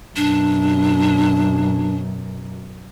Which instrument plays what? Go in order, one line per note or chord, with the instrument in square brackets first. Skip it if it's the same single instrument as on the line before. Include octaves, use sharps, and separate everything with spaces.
[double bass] F#2 B2 [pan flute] D4